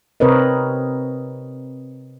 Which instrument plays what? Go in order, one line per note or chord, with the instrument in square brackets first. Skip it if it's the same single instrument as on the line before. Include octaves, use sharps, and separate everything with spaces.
[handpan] C3 C4 A#4 B4 C#5 D#5